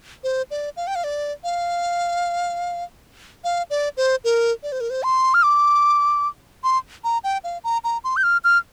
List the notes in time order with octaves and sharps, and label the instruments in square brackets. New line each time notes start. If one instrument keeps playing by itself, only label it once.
[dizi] C5
D5
F5
G5
F5
D5
F5
F5
D5
C5
A#4
D5
C5
A#4
C5
C6
F6
D6
C6
A#5
G5
F5
A#5
A#5
C6
G6
F6
F6